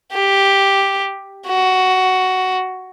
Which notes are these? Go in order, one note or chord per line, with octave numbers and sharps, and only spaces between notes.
G4
F#4